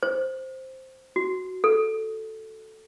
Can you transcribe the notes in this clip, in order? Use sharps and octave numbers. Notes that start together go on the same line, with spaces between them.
C5
F#4
A4